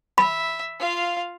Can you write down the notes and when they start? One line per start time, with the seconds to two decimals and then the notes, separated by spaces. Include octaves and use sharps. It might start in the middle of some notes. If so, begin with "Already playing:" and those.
0.18 E5 B5
0.79 F4 F5